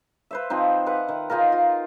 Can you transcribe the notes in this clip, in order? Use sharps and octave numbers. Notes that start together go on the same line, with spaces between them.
B4 C5 E5
F3 C4 D#4
B4 E5 F#5
D#3
D#4 F4 G#4 A#4
F4